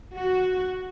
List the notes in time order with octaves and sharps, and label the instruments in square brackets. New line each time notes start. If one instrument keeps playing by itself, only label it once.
[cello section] F#4